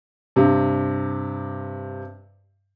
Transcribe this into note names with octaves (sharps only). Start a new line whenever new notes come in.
G2 C3